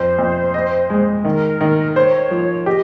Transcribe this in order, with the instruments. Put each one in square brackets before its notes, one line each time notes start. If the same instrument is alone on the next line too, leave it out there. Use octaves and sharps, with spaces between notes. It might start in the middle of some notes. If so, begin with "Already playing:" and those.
Already playing: [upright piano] F2 [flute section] C5
[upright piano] F2
D#5
G#3
[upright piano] D#3 [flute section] A#4
[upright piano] D#3
[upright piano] C5 [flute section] C#5
[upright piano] F3
[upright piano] G4 [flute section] D#5